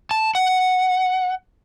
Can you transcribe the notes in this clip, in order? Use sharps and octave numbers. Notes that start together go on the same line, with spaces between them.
A5
F#5